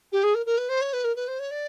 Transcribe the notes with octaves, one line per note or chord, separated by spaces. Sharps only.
G4
G#4
A#4
A#4
B4
C5
C#5
B4
A#4
B4
C5
C#5
D5